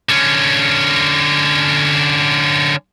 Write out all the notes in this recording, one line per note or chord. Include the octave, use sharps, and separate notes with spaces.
D3 C#4